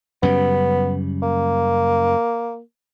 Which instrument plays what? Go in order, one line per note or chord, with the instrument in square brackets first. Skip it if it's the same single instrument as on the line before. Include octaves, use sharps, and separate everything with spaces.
[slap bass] F#2 C#3 G3 [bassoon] B3
[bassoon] A#3